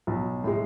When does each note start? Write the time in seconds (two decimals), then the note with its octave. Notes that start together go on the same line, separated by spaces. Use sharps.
0.07 B1
0.44 A2 G#3